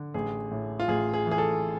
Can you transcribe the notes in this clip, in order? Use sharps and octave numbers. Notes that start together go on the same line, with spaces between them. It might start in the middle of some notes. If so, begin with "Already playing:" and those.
Already playing: D3
A1 G#4
A2
F4
A1 G#4
G#4
E3
G#4
A4